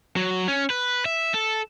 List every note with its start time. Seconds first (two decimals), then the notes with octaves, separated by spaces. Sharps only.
0.16 F#3
0.48 C#4
0.70 B4
1.05 E5
1.34 A4